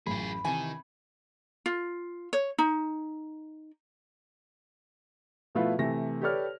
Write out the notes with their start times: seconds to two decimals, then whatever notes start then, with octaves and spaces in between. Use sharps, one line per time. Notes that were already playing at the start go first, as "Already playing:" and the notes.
0.07 A1 F#2 F4 G#4 B5
0.45 C3 D#3 E3 G#5
1.66 F4
2.33 C#5
2.59 D#4
5.55 B2 F3 A3 E4 F4 B4
5.78 C3 E3 A3 A#6
6.22 G4 A4 B4 C#5 D5 F6